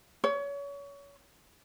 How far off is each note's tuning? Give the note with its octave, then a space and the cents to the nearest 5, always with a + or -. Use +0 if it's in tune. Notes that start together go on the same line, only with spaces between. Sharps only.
C#5 +30